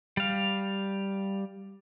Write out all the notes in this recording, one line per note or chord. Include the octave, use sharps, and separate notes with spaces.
G3 F5